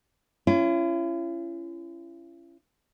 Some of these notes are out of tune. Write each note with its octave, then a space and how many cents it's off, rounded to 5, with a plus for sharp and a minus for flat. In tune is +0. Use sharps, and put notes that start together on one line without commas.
C#4 +0 E4 +45